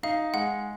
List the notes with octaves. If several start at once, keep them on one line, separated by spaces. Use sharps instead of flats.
D#4 F5
G#3 F#5